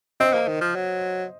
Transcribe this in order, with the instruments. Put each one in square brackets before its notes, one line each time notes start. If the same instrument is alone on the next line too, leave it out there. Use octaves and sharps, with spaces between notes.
[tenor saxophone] C4 [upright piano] C5 D#5
[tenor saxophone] A#3
D#3
F3
F#3